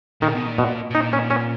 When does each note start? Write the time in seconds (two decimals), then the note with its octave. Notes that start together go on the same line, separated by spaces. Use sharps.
0.22 A#2 D#3
0.35 B2
0.47 A#2
0.58 B2
0.90 B2
0.94 A#2 D#4
1.13 C#4
1.30 C#4